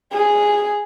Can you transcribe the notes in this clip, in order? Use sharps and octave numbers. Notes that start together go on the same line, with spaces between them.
G#4